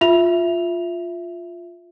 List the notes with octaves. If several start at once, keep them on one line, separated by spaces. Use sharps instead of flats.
F4 E5 F7